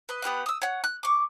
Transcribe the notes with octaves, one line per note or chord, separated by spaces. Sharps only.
B4 D#5
B3 G4 B4 F#5
D#6 E6
C#5 F#5
F#6
C#6 D6